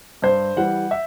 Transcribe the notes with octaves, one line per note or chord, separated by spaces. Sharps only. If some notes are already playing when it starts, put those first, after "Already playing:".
G2 C5
E3 G3 F#5
E5